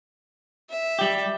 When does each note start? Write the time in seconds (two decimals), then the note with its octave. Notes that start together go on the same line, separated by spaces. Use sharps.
0.70 E5
0.99 G3 G4